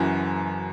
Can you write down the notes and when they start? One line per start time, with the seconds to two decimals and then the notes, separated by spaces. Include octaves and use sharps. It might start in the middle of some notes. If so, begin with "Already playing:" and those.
Already playing: F#1 F#2 E3 F#4